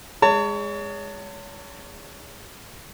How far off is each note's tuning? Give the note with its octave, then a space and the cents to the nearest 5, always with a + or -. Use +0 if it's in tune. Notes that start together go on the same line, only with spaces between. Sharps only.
G#3 -15 C#5 +30 A5 +40